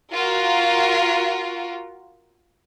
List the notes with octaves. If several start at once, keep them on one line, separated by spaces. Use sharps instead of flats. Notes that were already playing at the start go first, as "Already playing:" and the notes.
F4 F#4 A#4